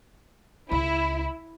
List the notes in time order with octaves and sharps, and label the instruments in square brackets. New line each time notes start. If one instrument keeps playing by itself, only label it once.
[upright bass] C#2 [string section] E4